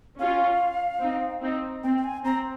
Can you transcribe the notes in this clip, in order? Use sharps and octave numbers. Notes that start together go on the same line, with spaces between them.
C#4 F4 F5
C4 D#4
C4 D#4
C4 G5
G5
G#5
C4 A#5